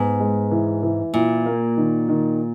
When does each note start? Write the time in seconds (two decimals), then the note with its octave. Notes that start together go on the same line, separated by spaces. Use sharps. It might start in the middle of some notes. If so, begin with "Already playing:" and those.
Already playing: G#2 B3
0.20 G#3
0.51 E3
0.83 E3
1.14 A#2 E4
1.46 A#3
1.77 D#3
2.09 D#3